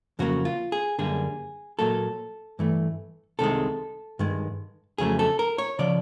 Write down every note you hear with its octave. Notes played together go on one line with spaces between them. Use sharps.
F2 C#3 F#3 A#3 F#4
F4
G#4
F#2 D3 G3 A#3 G#4
A#2 F#3 A#3 A4
G2 E3 A3
C2 C3 D#3 G#3 A4
G2 D#3 G#3
F2 C#3 F#3 A3 G#4
A4
A#4
C#5
C#3 F3 D5